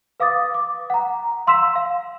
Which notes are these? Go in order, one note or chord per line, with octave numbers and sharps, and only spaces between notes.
B4 F5 D6 D#6 A6
D6
F#5 A#5
F5 C6 E6 B6 E7
F5